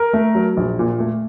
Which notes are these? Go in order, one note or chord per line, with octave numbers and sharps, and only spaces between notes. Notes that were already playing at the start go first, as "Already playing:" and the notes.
Already playing: A#4
A3
F#3
A#1
A#2
A3